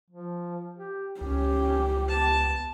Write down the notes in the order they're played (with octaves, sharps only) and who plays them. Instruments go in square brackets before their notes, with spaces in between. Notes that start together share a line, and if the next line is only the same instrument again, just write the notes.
[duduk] F3
G4
[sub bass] C#2 [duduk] C#4 [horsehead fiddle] G4
[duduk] B3 [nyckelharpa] A5